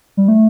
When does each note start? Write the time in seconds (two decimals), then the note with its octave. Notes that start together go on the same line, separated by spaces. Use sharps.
0.17 G3
0.28 A3